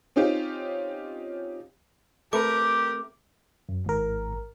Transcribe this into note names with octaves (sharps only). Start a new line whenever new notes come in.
C4 C#4 D#4 F4 G4
A3 C4 G4 A#4 B4 D6
F#2
G#1 G#2 A#4